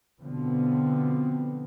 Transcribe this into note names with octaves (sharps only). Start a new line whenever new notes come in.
B2 D3 F3 B3 C4